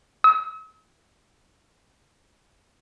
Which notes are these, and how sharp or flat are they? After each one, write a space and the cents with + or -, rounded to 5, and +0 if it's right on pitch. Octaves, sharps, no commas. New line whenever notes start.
E6 -45